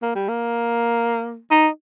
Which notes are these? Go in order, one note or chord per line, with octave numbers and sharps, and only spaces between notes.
A#3
G3
A#3
D#4